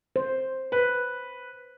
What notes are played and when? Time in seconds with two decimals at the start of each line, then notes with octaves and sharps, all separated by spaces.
0.16 C5
0.72 B4